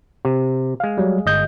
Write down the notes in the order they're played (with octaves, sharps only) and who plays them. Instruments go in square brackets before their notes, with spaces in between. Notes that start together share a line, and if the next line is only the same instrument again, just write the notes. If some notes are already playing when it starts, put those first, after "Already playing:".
[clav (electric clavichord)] C3
G#3 F5
[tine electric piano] F#3 G3
G1 D#5 G6